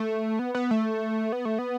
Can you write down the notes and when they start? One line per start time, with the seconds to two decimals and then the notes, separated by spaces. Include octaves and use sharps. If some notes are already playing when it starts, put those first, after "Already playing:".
Already playing: A3
0.39 B3
0.55 B3
0.71 A3
1.32 B3
1.45 A3
1.59 B3